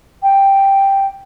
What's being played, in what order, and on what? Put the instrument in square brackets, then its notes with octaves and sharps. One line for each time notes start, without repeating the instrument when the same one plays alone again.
[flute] G5